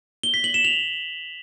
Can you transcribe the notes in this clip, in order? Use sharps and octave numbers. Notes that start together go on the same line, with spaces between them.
G7
B6
F#7
E7
F7